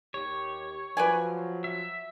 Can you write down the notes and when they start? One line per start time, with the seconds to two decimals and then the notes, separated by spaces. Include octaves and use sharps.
0.14 D#2 G4 C#5
0.97 F3 F#3 B4 D5 G#5
1.64 E5